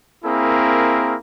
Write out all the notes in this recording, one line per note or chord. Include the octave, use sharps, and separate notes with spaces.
A#3 C4 E4 G#4 A#4